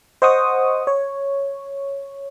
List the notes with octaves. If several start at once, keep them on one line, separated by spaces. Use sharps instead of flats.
C5 D#5 F#5 C#6 D#6
C#5